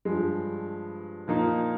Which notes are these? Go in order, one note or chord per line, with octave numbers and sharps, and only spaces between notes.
G2 F3 G#3
A#2 F3 A#3 D#4